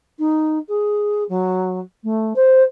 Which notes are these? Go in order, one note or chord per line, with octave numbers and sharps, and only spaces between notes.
D#4
G#4
F#3
A3
C5